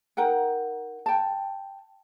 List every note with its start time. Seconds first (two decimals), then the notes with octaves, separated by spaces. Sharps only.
0.17 D#4 A#4 F#5 G5
1.06 G5 A5